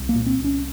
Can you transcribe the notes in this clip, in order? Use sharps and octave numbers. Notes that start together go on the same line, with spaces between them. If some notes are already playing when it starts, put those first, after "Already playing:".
Already playing: C2
A#3
A#2
C4
C2
C#4